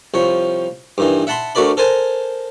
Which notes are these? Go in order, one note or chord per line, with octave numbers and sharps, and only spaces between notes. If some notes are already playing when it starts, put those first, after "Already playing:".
C2 F3 C#5
G2 D#3 E3
E5 F#5 A5 B5 C6
D2 A3 F#4 A#4 D5 B5
A4 A#4 C5 G#5 A5